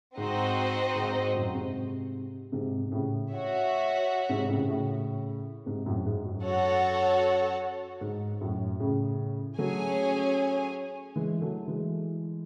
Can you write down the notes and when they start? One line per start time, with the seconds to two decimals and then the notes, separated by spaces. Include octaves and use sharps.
0.17 G#2 C4 D#4 F#4 C5 D#5
0.95 G#2
1.15 G#2
1.35 F#2 A2
1.54 G#2 C3
2.52 G#2 C3
2.92 A2 C#3
3.31 F#4 C#5 E5
4.29 G#2 C3
4.49 A2 C#3
4.68 A2 C#3
5.66 G#2 C3
5.86 F#2 A2
6.06 G#2
6.25 F#2
6.45 F#4 A4 C#5 F#5
8.01 G#2
8.41 F#2 A2
8.80 A2 C#3
9.58 F#3 A3 C#4 G#4 C#5 G#5
11.16 E3 G#3
11.42 F#3 A3
11.68 E3 G#3